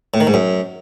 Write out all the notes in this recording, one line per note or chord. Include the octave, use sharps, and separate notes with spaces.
A2
D#3
G#2
F#2